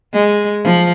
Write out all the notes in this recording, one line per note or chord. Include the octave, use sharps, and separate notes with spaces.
G#3
F3